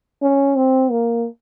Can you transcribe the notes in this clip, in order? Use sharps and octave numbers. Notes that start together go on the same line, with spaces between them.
C#4
C4
A#3